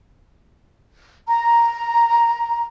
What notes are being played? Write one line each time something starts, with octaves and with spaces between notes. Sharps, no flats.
A#5